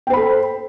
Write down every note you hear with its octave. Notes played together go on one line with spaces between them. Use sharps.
A4 C5 G5 B5